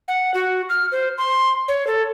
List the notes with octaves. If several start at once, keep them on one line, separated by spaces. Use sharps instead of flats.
F#5
F#4
F6
C5
C6
C#5
A4